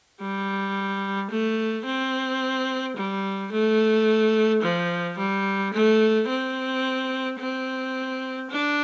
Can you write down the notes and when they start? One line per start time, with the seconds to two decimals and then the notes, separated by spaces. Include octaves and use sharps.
0.21 G3
1.31 A3
1.86 C4
2.97 G3
3.52 A3
4.63 F3
5.18 G3
5.74 A3
6.29 C4
7.40 C4
8.51 D4